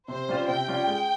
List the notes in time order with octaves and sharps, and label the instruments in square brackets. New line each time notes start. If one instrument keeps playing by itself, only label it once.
[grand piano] C3 [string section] C5
[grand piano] G3 C#4 F4
[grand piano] C3 [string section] G5
[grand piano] G3 C#4 F4
G#3